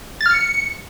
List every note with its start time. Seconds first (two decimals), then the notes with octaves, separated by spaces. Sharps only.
0.21 A6
0.26 F6
0.31 C#7